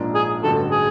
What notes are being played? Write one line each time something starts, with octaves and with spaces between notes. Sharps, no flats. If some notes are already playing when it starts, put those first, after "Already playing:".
Already playing: A#1 G#2 F3 A#3 D4
G#4
A1 G2 D3 F#3 A4
G#4